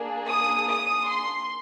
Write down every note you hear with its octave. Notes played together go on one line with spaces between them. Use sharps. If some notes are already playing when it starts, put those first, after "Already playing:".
Already playing: A#3 D4 G#4
D#6
D#6
C6